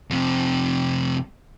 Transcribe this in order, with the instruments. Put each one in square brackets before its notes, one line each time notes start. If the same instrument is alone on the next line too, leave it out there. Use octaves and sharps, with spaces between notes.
[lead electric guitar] F2 C3